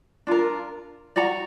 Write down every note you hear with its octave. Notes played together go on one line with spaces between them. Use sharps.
D4 F4 A#4
F#4 D5 F#5 A#5